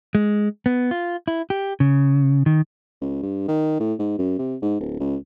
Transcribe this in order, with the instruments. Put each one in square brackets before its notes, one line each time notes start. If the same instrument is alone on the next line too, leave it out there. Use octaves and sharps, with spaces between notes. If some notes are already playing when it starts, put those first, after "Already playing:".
[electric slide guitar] G#3
B3
F4
E4
G4
C#3
D#3
[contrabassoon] C#2
G2
D#3
A2
G#2
F#2
C3
G#2
D1
C#2